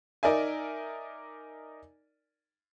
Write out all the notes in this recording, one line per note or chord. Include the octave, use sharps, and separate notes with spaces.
D#4 A#4 D5 E5 G#5